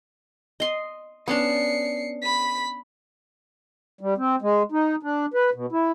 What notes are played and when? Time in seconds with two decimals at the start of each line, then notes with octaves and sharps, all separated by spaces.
0.60 D#5 C6
1.28 B3 C#4 D4 C7 C#7
2.22 B5 B6
4.01 G3
4.18 C4
4.42 G#3
4.72 D#4
5.03 D4
5.34 B4
5.54 B2
5.72 E4